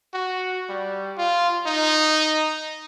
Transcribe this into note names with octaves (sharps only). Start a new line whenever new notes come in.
F#4
G3
F4
D#4